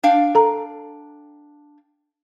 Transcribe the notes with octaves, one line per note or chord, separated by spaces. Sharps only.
D4 F5 G5
A4 A#5